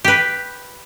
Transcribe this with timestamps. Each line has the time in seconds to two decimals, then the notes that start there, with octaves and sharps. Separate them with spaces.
0.04 G4 B4